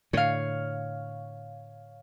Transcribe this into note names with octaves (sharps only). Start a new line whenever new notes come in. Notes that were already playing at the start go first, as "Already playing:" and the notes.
A2 D3 C#5 F5